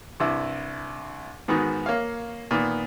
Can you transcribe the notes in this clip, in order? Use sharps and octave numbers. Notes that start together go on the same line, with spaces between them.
C2 G2 E4 E6
G#2 D#3 B3 F#4
A#3 C#5 F5
A#2 D#3 B3